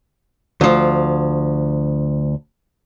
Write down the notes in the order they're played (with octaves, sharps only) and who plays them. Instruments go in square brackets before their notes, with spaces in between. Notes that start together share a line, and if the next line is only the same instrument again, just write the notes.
[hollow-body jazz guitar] D2 F3